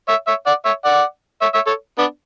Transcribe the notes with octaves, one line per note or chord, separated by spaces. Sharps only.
C#5 E5
C#5 E5
D5 F#5
C#5 E5
D5 F#5
C#5 E5
C#5 E5
A4 C#5
B3 D4